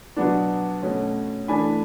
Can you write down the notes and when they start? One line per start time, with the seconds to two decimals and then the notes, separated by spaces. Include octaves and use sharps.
0.16 B2 F#3 B3 D4
0.82 B2 A3 C#4
1.48 E3 A3 D4 G#5 B5